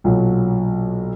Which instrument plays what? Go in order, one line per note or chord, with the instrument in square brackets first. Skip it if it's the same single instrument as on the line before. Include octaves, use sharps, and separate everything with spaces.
[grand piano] B1 A#2 F#3